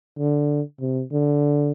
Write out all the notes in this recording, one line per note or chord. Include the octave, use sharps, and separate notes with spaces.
D3
C3
D3